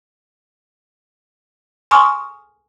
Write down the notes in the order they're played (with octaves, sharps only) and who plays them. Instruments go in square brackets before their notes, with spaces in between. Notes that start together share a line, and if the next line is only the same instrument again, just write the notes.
[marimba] G#5 C6 C#6 D#6 F6